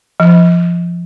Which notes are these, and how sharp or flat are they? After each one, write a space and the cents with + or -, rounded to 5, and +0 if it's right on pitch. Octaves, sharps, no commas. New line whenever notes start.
F3 -15